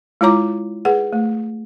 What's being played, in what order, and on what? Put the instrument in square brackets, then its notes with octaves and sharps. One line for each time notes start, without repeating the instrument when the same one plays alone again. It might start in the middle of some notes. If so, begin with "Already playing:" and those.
[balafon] G#3 E4 F4 C#5 A#5 D6
G#4 B4 F#5
A3